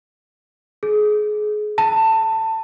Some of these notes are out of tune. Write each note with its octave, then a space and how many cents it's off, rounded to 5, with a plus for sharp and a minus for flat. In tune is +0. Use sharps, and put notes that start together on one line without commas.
G#4 +25
A5 +20